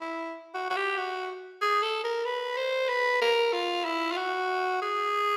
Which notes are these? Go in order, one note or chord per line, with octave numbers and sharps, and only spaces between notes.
E4
F#4
F#4
G4
F#4
G#4
A4
A#4
B4
C5
B4
A#4
F4
E4
F4
F#4
G#4